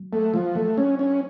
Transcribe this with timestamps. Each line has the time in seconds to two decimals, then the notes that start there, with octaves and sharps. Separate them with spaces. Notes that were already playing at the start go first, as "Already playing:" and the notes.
Already playing: F#3
0.13 A3
0.34 F3
0.55 A3
0.78 C#4
0.99 C#4